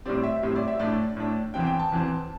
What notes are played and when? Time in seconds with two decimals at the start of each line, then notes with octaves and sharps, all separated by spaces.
0.06 A2 G3 C4 D5
0.23 E5
0.43 A2 G3 C4 E5
0.56 D5
0.68 E5
0.79 A2 A3 D4 D5
1.17 A2 A3 D4
1.54 E2 E3 C4 G5
1.67 G5
1.79 A5
1.92 E2 E3 C4